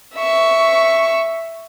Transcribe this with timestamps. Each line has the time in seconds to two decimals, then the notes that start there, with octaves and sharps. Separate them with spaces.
0.15 E5 C#6